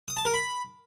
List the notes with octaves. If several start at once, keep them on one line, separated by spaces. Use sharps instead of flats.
D#6
A5
A#4
B5